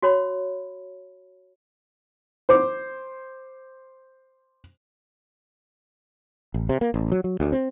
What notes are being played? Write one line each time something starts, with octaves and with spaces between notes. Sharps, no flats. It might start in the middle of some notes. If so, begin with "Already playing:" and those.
F#4 C#5 B5
C5 D6
A1
C3
A#3
A1
F#3
F#3
D2
C4